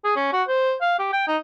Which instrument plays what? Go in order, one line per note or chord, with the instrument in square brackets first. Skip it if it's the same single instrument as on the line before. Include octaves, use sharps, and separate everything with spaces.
[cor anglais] G#4
C#4
F#4
C5
F5
G4
G5
D#4